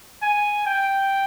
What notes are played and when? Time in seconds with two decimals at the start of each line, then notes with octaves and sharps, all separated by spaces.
0.22 G#5
0.67 G5